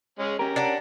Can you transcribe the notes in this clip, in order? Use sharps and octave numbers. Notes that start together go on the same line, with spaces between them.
G#3 C#4 G#4
C#4 G4 A#4 A#5
D4 D5 F#5